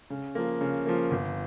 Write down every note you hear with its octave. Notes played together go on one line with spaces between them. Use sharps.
C#3
F3 A#3
C#3
F3 A#3
G1